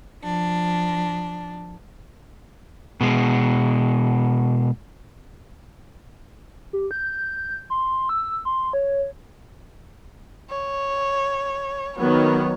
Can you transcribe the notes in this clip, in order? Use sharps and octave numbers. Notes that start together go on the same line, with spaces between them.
F3 D4
B2 G#3
G4
G6
C6
E6
C6
C#5
C#5
D#3 F#3 B3 C#5